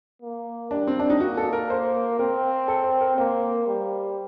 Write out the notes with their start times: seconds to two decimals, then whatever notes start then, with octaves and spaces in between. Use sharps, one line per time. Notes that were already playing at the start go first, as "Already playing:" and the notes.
0.22 A#3
0.71 G3 D4
0.87 C4
0.99 D4
1.10 D#4
1.20 A#3 F#4
1.37 A4
1.53 A#4
1.70 C5
2.19 C4 A#4
2.68 A4
2.84 C5
3.01 A#4
3.17 A#3 C5
3.67 G3